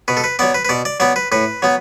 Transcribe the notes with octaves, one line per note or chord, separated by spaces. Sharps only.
B2 B4
A4
B4
F#3 B3 D5
B4
B4
B2 D5
D5
F#3 B3 D5
B4
A2 B4
F#3 B3